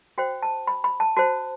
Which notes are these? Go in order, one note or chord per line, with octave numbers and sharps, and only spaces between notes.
F#4 C5 G5
A5
B5
B5
A5
F#4 C5 A5